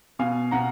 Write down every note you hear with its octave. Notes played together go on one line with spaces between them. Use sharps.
B2 F5 G#5
B2 F#5 A#5